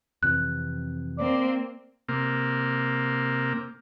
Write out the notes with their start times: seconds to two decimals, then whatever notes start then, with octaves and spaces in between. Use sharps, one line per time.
0.23 F2 C3 E3 F#6
1.18 A#3 C4 D5
2.08 C3 A#3